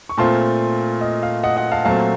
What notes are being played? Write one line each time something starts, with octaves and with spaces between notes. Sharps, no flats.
C#6
A#2 A3 C4 F4 A5 C6
D#5
F5
D#5 F#5
D#5 F#5
F5 A5
A#2 F#3 A3 C4 F5 A5